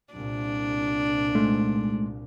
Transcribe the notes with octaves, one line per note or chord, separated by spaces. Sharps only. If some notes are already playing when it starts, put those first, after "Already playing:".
C2 A#2 D4
G#2 A3